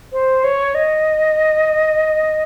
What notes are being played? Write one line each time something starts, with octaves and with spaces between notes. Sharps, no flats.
C5
C#5
D#5